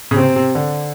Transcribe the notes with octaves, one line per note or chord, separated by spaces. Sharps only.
C#3
C3 C4
C3
D3